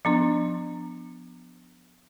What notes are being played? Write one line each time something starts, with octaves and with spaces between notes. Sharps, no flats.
F3 B3 D4